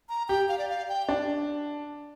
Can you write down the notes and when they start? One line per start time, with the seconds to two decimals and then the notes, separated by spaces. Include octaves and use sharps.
0.09 A#5
0.28 G4 G5
0.48 F5
0.58 D5
0.69 F5
0.89 G5
1.09 D4